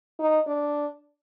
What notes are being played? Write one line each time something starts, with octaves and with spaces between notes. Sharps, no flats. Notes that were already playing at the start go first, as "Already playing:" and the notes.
D#4
D4